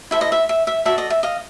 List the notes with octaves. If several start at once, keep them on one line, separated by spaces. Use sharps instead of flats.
E4 A4 C5 E5
D#5
E5
E5
E5
F#4 A4 D5 E5
D#5
E5
D#5 F5